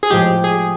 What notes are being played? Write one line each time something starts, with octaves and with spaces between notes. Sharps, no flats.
G#4
A2 F3 G#3 G4
G#4